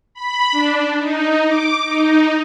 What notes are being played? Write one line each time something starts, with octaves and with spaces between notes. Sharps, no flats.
B5
D4
D#4
D6
D#4